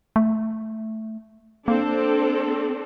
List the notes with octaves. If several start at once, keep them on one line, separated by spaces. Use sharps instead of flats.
A3
A#3 C4 D4 A4